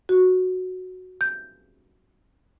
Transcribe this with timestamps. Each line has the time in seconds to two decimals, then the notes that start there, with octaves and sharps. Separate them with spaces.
0.09 F#4
1.21 G6